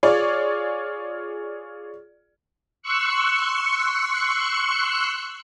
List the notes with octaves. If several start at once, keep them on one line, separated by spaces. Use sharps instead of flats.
F4 G#4 C#5 D5
C6 C#6 E6 F#6 C#7